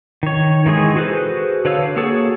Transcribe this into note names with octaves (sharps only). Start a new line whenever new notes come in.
D#3 C#5
D#3 E3 G#3 G#4 C#6
F#4 G#4 A4 B4 C5
D3 B4 C#5 F5 E6
A#3 F#4 G#4 A4 C#5